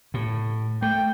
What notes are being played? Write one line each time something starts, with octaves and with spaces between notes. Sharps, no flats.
A2
A3 G5